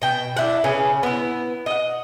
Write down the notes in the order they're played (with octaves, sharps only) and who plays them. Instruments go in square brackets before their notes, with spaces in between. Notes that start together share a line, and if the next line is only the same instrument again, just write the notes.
[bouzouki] B2 G5
D4 E4 F#5
C#3 C#4 B4
B3 E4
D#5 F#5